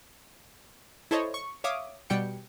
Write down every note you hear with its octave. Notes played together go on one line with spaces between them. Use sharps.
E4 A4 C5 C#5 D#5
C#6
C#5 E5 F5 D6 D#6
B2 G3 G5 C#7